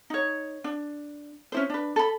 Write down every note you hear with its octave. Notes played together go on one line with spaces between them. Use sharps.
D#4 C#5
D4
C#4 E4 C5
D4 B4
A4 B5